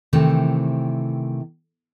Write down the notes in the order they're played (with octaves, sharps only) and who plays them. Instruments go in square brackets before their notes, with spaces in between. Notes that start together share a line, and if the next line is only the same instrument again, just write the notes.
[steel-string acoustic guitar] C3 D#3 E3 A3 C4